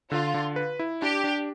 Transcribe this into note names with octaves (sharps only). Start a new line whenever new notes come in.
D3 F4
D3
B4
E4
D4 G4
D4